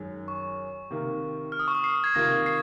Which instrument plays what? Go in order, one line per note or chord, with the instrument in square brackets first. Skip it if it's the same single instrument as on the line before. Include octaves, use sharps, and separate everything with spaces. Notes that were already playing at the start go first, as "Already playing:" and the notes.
Already playing: [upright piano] F#2 D#3 G#3
[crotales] C#6
[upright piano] C3 D#3 A#3
[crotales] F6
D#6
C#6
D#6
C7
G#6
[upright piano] C3 D#3 A#3 F4 [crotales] A#6
[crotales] C7